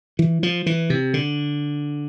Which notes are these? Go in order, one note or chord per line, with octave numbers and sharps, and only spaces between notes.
E3
F3
E3
C3
D3